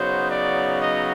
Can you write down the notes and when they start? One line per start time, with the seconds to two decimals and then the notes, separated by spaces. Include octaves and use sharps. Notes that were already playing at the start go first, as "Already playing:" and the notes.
Already playing: C#3 F#3 B3 D#4 C5
0.30 D5
0.82 D#5